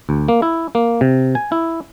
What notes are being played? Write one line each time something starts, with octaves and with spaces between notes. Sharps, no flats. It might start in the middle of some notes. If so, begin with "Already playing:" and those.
D2
A#3
E4
A#3
C3
G#5
E4